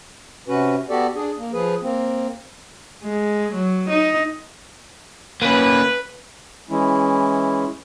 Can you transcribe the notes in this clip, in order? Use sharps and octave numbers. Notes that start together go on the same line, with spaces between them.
C3 C#4 F#4 B4
B3 F#4 G4 A4 D5
D4 G#4
A#3
F3 G#4 B4
A#3 C4
G#3
F#3
D#4
A#3 C#4 B4
E3 G#3 C#4 E4